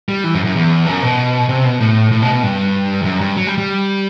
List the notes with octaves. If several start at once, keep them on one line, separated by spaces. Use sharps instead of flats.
G3
E3
F#2
F#2
E2
F#2
B2
C3
B2
A2
A2
B2
B2
G2
E2
F#2
G2
F#3
G3
G3